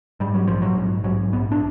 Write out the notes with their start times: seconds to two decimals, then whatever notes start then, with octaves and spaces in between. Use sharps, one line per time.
0.20 G#2 G3
0.34 F#3
0.48 A#1 F3
0.62 F#3
0.77 G#2
1.04 G#2 F#3
1.32 A#1 B3
1.51 D4